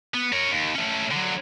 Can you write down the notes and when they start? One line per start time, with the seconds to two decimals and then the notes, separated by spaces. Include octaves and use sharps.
0.14 B3
0.33 A#4 C#5
0.52 D#2
0.75 A3 C#4
1.11 D3 F#3